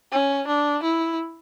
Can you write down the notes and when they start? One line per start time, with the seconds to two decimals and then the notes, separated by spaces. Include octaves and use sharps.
0.12 C#4
0.47 D4
0.83 E4